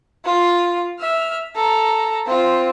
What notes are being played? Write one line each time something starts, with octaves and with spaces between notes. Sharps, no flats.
F4
E5 F6
A4 A#5
C4 F4